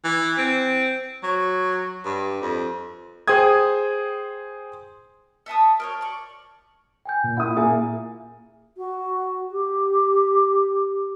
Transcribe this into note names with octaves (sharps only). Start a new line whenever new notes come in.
E3
C4
F#3
G2
F2
G#4 C5 G5 D#6 G#6
A4 E5 A5 D#6
A#4 C5 C#5
D5 C#6
G5 G#5 G6
A#2
E4 F#5 D#6
A#3 G#4 E5 G#5
F#4
G4